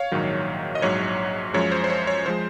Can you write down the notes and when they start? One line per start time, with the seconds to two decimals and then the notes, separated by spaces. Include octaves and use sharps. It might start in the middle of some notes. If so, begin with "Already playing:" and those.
Already playing: C#5 F5
0.12 A#1 G#2 D#3 F#3
0.75 D#5
0.82 A#1 G#2 F#3 C#5
1.54 F#2 F3 G#3 C#5
1.71 C5
1.84 C5
1.90 C#5
2.07 C#5
2.26 F3 G#3 C5